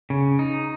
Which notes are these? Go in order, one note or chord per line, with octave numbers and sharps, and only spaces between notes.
C#3
D#4